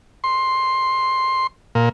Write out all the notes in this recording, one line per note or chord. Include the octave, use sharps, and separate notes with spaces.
C6
A#2